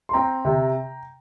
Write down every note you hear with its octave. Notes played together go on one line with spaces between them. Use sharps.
C6
C4 G5 A#5
C3